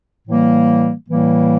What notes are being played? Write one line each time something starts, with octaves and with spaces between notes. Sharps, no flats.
A2 E3 G3 A#3
A2 E3 G3 A#3